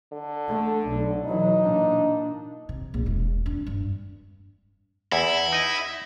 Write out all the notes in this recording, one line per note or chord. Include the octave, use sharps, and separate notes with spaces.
D3
A3
B1
E3 F#3 D#4
A#2 D4
C3
A#1
E1
D4
G2
E2 E4
D#4 D#5